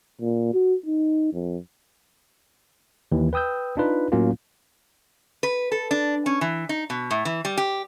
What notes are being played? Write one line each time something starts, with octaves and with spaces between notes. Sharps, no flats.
A#2
F#4
D#4
F2
D#2 E3
B4 G5 D#6 E6 G6
D4 D#4 F4 B4
A2 F#3 A#3 C#4 F4
B4
A4
D4
C#4
E3
D#4
B2
A2
E3
G3
G4